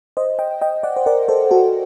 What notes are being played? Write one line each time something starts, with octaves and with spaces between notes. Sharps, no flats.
C5 D#5
D#5 G5
D#5 G5
D5 F#5
C5
A#4 D5
A4 C5
F#4 A4